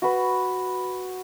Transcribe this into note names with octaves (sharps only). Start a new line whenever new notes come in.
F#4 B4